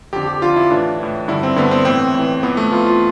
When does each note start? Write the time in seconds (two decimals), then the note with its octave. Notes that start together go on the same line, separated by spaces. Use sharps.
0.13 F2 D3 G4
0.28 G4
0.42 F2 D3 F4
0.56 E4
0.70 A2 E3 D4
1.00 A2 E3
1.28 G2 D3 E4
1.43 C4
1.56 G2 D3 B3
1.71 C4
1.85 A2 E3 C4
2.14 A2 E3
2.43 F2 E3 B3
2.57 A3
2.71 F2 E3 F4
2.86 F4